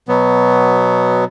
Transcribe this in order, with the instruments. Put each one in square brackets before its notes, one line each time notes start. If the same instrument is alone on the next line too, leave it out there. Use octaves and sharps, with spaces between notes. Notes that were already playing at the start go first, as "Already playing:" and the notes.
[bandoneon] B2 F#3 B3